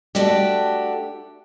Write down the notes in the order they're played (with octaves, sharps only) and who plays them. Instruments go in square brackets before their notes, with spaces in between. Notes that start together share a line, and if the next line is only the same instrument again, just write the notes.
[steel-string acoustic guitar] A3 D4 F#4 G4